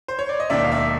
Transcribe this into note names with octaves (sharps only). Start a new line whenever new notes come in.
C5
C#5
D5
D#5
E1 D#2 D#3 D5 E5
F5
D5 E5